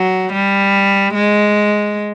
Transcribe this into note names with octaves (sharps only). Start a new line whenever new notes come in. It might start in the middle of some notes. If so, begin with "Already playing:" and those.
Already playing: F#3
G3
G#3